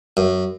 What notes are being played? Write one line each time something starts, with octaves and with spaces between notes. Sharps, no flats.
F#2